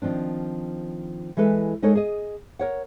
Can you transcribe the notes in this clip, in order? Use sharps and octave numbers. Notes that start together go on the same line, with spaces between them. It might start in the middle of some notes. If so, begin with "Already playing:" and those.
D#3 F3 C4 D4
E3 G#3 A4 B4
G#3 D#4 A4 A#4 C#5
G#4 D#5
A#4 C#5 F#5